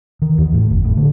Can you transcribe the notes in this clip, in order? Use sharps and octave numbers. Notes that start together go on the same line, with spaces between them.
D#3
E2
A2
F#1
A2
D3